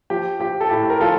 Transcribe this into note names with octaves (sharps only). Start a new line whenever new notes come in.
F3 G4
F3 G4
A4
A2 G4
A#4
F3 F4 A4